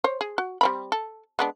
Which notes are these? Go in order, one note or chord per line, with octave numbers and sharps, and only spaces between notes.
C5 C#5
G#4
F#4
G3 C4 B5
A4
G#3 B3 D4